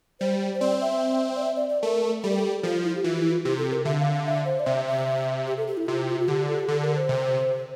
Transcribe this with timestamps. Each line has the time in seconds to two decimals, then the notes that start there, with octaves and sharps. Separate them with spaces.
0.20 G3 C5
0.55 C5
0.61 C4 D5
0.81 E5
1.36 D5
1.42 E5
1.56 D5
1.69 D5
1.83 A3 A#4
2.23 G3 A4
2.30 A#4
2.37 A4
2.63 F3 F4
2.84 E4
2.95 G4
3.04 E3 F4
3.21 E4
3.31 F4
3.44 C3 G4
3.58 A4
3.71 A#4
3.85 D3 E5
3.99 F5
4.12 F5
4.26 E5
4.45 C5
4.60 D5
4.66 C3 E5
4.87 E5
5.47 G4
5.57 A4
5.67 G4
5.77 E4
5.87 C3 F4
6.08 F4
6.20 F4
6.28 D3 G4
6.48 A4
6.59 G4
6.68 D3 A4
6.82 A#4
6.96 C5
7.09 C3